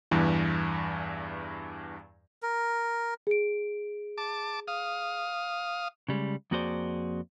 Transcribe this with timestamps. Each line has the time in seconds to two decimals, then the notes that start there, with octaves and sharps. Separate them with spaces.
0.11 E2 G2 E3
2.42 A#4
3.27 G#4 D7
4.18 A5 D6
4.68 F5 D#6
6.09 C#3 G3 G#3
6.51 F2 A#3 F#4 G#4 C5 D5